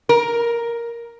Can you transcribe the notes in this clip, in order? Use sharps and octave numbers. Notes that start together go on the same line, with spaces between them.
A#4